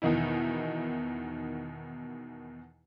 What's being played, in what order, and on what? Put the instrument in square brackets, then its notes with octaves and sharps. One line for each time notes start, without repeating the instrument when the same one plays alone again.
[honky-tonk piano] E2 B2 D#3 D#4 E4